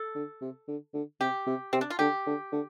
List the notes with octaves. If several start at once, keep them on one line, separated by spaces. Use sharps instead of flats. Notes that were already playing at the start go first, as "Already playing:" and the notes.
Already playing: A4
D3
C3
D3
D3
C3 G4
C3
C3 C4
D4
F4
D3 G4
D3
D3